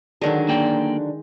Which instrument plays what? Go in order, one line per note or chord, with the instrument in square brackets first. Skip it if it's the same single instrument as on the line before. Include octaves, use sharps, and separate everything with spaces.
[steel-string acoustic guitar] D3 F#3 D4 [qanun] D#3 G#3
[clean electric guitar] A#3 D5 G5